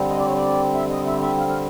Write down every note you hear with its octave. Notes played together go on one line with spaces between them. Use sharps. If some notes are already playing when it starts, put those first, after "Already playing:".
Already playing: D3 G3 C4
D#5
D5
C#5
D5
E5
D#5
E5
E5
F5
F5